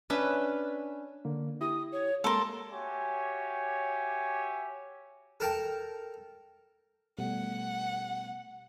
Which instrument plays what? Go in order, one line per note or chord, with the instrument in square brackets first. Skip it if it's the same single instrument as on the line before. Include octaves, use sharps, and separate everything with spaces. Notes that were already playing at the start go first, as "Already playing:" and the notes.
[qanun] C#4 D4 B4 E5
[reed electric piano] D3 A#3
[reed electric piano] E4 G4 [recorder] D#6
[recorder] C#5
[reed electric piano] G#3 A#3 [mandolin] A4 A#4 [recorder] C6
[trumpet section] F#4 G4 C#5 E5 G#5
[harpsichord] A4 A#4 G5 A5
[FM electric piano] B2 G3 A3 [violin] F#5